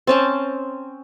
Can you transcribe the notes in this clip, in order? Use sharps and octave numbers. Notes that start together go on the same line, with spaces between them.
C4 C#4 A5